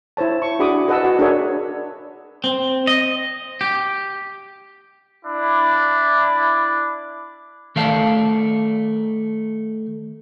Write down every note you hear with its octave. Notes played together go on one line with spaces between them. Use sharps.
E4 C5 C#5 A5
C#6
D4 F#4 G#4 B5 D6 D#6
G#4 B4 D#5 F#5 A5 E6
F#4
D4 G#4 A#4 C#5 E5
C4
D#5
G4
D4 E4
D#3 A3 D5 F5 A5